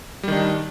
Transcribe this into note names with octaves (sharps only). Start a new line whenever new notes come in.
D#3 G3 D4